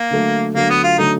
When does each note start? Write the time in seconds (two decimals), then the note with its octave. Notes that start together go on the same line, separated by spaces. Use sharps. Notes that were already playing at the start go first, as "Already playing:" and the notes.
Already playing: A#3
0.11 D3 F#3 A3
0.54 D3 F#3 A3 A#3
0.70 B3
0.83 F4
0.98 D3 F#3 A3 D#4